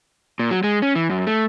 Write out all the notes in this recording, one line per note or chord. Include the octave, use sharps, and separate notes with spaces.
A#2
F#3
G#3
C#4
E3
F#2
A3